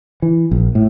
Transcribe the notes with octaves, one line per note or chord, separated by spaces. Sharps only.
E3
A#1
A2